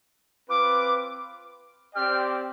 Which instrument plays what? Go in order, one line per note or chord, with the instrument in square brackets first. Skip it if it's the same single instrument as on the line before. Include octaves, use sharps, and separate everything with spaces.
[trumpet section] C4 F4 B4 [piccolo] D6
[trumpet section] C4 G4 D5 G5 [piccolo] F6